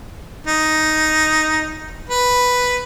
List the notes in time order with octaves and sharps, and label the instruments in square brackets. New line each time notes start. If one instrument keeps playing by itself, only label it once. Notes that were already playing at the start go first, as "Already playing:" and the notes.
[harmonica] D#4
B4